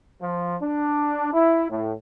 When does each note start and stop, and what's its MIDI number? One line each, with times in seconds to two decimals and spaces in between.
0.22 0.57 53
0.62 1.31 62
1.34 1.67 64
1.71 1.94 45